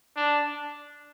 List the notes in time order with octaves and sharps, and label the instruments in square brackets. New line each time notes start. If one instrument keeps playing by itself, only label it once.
[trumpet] D4